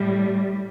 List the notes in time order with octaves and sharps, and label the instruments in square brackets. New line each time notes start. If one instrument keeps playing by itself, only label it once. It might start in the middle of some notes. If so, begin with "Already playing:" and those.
Already playing: [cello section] A2 G3